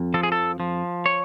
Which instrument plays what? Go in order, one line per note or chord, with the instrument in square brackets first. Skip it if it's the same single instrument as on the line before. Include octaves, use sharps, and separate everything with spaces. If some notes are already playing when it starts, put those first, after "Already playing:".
Already playing: [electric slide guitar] F2
F3 A4
G#4
A4
F3
C#5